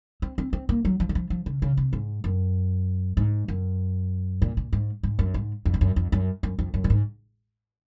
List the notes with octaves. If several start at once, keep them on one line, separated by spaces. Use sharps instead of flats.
C4
C4
C4
A#3
F#3
F3
D#3
F3
F3
C#3
C#3
C3
G#2
F#2
G#2
F#2
A#2
A#2
G#2
G#2
F#2
G#2
F2
G#2
F#2
F2
F#2
F#2
F2
F#2
A#2
G#2